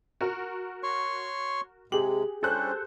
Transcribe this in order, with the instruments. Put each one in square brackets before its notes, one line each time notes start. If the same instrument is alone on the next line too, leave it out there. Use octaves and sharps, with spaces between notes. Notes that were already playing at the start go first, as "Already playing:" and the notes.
[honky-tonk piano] F#4 A#4
[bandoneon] C#5 C6 C#6
[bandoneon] C3 G#3 [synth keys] G4 G#4 [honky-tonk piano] F#7
[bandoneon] G3 C#4 D4 [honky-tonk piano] A4 C5 F#6